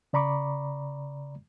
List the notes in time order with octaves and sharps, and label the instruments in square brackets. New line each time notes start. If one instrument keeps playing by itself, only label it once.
[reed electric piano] C#3 D5 A#5 B5 C#6 D6